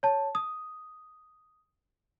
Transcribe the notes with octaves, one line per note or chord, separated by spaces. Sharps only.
C#5 A5
D#6